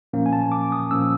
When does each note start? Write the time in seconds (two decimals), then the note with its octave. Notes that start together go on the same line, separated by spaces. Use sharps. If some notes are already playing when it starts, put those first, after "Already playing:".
0.13 A#2 F3 A#3 C#4
0.26 G#5
0.33 A5
0.52 D6
0.72 D#6
0.91 A#2 F3 A#3 C#4 E6